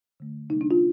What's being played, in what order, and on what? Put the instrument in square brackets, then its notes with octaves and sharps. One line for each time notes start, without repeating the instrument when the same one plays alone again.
[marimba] D3 A3
C3 G3 A#3 D#4
D4
F4